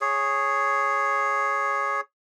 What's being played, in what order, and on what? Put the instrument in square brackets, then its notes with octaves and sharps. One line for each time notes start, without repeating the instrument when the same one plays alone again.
[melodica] G#4 C#5